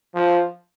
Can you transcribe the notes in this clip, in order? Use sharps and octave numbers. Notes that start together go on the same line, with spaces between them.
F3